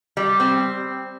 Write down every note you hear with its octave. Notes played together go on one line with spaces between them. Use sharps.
G3
C4